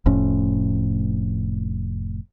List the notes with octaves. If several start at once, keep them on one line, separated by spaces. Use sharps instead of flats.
F1 F2 A2 C#4